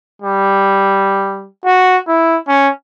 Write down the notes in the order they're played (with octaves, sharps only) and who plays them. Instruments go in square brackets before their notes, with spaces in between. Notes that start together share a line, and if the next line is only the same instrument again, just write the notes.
[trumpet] G3
F#4
E4
C#4